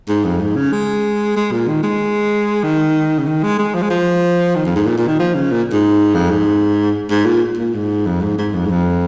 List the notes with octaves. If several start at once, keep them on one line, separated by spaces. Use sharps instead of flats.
G#2
F2
G#2
C#3
G#3
G#3
A#2
D#3
G#3
D#3
C#3
D#3
G#3
G#3
F3
G#3
F3
D#3
F2
G#2
A#2
A#2
D#3
F3
C#3
A#2
G#2
F2
G#2
G#2
A#2
A#2
G#2
F2
G#2
G#2
F2
G#2
F2